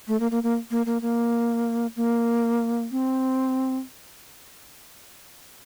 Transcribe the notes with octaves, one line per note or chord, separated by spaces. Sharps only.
A3
A#3
A#3
A#3
A#3
A#3
A#3
A#3
C4